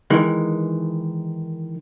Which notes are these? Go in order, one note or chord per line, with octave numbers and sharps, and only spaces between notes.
D#3 E3 G#3